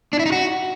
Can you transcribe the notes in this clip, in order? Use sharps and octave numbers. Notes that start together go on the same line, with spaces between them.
D4
E4
D#4
F#4